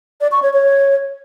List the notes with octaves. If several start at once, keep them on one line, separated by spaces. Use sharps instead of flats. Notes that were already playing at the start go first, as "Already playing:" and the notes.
D5
C#6
C#5
C#5